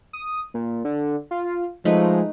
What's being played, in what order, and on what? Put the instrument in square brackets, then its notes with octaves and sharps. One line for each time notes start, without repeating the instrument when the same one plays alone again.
[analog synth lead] D#6
A#2
D3
F4
[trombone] F3 [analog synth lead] G#3 [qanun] A3 D#4 B4